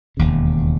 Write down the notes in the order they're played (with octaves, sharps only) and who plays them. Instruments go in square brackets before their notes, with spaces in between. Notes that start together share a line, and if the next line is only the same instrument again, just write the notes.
[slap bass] E1 D#2 C#3